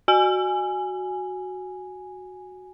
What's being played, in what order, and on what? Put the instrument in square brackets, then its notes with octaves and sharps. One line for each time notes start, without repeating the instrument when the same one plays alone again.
[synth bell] F#4 G#5